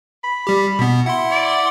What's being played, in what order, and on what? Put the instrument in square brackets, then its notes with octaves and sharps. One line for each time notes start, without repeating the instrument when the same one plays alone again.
[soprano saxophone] B5
[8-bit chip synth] G3 G4
B2 B3
[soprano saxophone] E4 [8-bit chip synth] F#5 C6
[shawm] D5